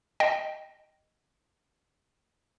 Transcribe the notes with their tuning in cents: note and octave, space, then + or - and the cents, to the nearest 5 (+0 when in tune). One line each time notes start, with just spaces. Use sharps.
D#5 +0 G5 +0